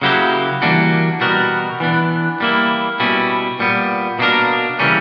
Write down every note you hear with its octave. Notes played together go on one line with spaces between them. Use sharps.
C#3 F#3 A#3 E4 G4
E3 G3 A#3 D4 F#4
B2 G3 B3 F#4 A#4
E3 B3 D4
G3 A#3 E4
B2 G3 C#4 E4
A#2 G3 B3
B2 A#3 D4 A#4
C#3 E3 G3 A#3 C#4